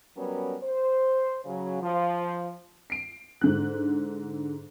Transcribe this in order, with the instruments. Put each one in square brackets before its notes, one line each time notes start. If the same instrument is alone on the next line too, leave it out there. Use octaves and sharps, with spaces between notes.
[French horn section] F#3 G3 B3 C#4 A#4
C5
C#3 F#3
F3
[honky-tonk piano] C7 D7
G#2 D3 F#6